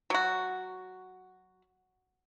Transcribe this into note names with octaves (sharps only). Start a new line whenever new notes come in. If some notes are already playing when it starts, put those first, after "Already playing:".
F#3 F#4